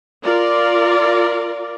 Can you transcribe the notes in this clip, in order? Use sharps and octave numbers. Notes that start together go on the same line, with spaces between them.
F4 A#4 D5